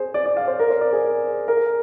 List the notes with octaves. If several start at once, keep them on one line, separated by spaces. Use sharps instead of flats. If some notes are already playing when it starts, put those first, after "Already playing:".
Already playing: G#4 C5
D5
D5
F5
C5
A#4
C5
D5
G#4
A#4